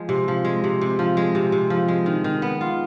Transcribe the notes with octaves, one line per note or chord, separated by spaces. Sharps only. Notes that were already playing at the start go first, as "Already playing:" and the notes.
Already playing: F3 G#3
C3
F3
G#3
C3
C3
F3
G#3
C3
C3
F3
G#3
D#3
D#3
B3
F4